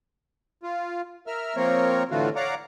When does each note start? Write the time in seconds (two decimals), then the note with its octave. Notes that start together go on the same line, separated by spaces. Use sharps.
0.63 F4
1.27 A#4 E5 F6
1.56 F3 A#3 C4 A#4 C#5
2.11 A2 D3 E3 A3 F4 F#4
2.36 C#5 D5 F5 F#5 A#5 D6